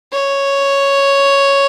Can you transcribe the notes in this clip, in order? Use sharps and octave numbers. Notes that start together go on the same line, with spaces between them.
C#5